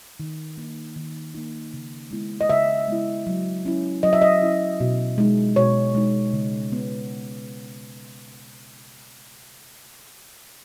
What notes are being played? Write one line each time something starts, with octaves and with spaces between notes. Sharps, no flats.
D#3
A#3 D#4
D#3
A#3 D#4
C#3
G#3 B3 E4
D#5
C#3 E5
G#3 B3 E4
F#3
C#4 E4
F#3 D#5
E5
D#5
C#4 E4
B2
G#3 D#4
B2 C#5
G#3 D#4
C#3
B3